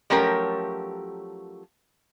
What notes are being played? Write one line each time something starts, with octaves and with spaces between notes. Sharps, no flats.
F3 F#3 A3 C#4 G4 A#4